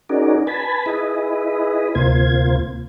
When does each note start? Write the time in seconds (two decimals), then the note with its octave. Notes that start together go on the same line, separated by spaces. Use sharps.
0.09 C#4 D#4 F#4 G#4 A#4 D5
0.47 B4 G#5 A5 B5
0.86 E4 G#4 B4 D#5
1.95 D2 C3 A#3 F4 C5 G#6